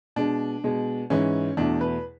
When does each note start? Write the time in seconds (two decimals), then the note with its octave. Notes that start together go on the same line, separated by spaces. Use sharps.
0.16 B2 G#3 D4
0.64 B2 G#3
1.10 G#2 E3 G#3 C#4
1.57 E2 B2 A3 D4
1.81 B4